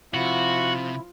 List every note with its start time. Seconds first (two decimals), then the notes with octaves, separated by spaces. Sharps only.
0.14 C3 F3 E4 F#4